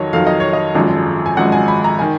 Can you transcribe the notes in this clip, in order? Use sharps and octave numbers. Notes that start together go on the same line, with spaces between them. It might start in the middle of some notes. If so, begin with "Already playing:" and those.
Already playing: F2 D#3 F#3 C#5 D#5
F2 D#3 F#3 F5
D#5
C#5
D#5
G#1 F#2 F3 G#3
G#5
G#1 F#2 F3 G#3 F#5
G#5
B5
A#5
D#3 G#5